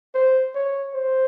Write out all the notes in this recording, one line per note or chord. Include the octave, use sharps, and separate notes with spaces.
C5
C#5
C5